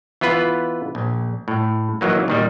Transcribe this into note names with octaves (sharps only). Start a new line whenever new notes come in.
E3 B3 F4 B4
A#1
A2
D#3 E3 F#3 A#3
A#2 D#3 G3